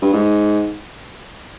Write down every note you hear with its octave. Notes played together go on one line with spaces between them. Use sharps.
G2
G#2